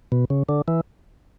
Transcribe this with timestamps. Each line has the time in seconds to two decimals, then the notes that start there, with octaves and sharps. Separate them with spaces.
0.12 B2
0.30 C#3
0.49 D3
0.68 E3